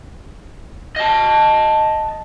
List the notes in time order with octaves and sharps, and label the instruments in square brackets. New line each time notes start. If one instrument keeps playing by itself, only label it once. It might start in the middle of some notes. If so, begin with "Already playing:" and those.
[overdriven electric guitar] D#5 A5